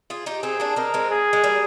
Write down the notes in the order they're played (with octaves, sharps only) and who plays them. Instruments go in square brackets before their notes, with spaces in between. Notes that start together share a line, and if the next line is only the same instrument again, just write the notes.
[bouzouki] F4 G#4
D#4 G4
[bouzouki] C4 D#4 [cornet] G#4
[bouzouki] A#3 D4
[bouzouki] C4 D#4 [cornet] A#4
[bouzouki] G#3 C4
[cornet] G#4
[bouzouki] G#3
G3 A#3